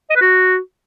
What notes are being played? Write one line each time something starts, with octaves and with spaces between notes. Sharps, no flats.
D#5
B4
F#4